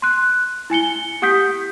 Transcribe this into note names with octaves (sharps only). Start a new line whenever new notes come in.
C6 F#6
E4 G#5 C#7 G7
G4 F#5 D#6 G6 B6